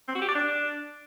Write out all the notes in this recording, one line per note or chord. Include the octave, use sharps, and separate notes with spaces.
C4
F#4
G4
D5
D4